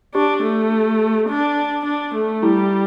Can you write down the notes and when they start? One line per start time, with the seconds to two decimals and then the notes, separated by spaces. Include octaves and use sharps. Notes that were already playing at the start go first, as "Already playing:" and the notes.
0.14 D4 G4
0.43 A3
1.29 D4
1.85 D4
2.15 A3
2.43 G3 E4